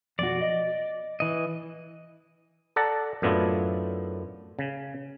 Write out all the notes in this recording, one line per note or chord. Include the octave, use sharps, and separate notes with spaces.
F2 B2 F#4 D5
D#5
E3 D#5
A4 D5 F#5 A5 A#5
F#2 A2 B3 D4 E4 F4
C#3